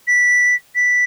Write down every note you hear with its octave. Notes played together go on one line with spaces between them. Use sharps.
B6
B6